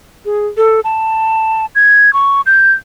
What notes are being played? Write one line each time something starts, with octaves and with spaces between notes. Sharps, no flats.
G#4
A4
A5
G#6
C#6
G6